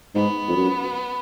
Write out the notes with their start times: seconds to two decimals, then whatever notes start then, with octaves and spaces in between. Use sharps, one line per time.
0.15 G#2 B3
0.48 F2
0.56 F#2